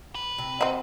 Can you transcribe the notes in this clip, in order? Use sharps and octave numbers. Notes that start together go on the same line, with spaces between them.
B4
C3
C4 F#4 D#5